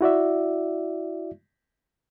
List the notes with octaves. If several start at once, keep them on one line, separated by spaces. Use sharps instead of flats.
E4 F#4 D5 E5